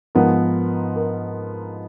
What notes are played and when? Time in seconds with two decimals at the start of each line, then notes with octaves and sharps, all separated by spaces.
0.15 G#2 F3 B3 A#4
0.96 A#4